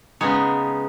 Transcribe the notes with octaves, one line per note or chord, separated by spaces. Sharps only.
C#3 G#3 B3 D#4 C#5